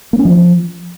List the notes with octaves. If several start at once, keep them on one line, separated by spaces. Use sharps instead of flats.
A#3
C#4
F3